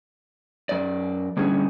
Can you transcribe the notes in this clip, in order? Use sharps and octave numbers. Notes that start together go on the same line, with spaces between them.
F#2 D5
D3 G3 C#4 G#4